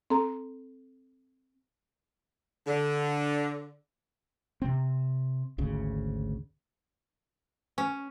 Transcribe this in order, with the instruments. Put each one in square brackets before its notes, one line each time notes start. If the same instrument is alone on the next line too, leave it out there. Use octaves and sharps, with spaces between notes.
[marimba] C4 A4 A#5
[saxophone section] D3
[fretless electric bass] C3 C4
G#1 D2 C#3
[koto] C#4